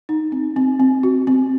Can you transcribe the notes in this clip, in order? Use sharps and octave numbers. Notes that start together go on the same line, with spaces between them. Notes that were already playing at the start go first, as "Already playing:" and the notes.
D#4
C4
C4
C4
F#4
C4